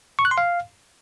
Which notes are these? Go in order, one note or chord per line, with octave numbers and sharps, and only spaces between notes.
C#6
F#6
C6
F5